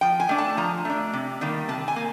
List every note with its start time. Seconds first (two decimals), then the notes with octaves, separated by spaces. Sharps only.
0.01 F3 G5
0.20 G#5
0.29 A3 D4
0.38 A5
0.57 F3 A#5
0.85 A3 D4
1.13 C3
1.41 D#3 G3 A#3
1.69 C3 A5
1.88 G#5
1.96 A#3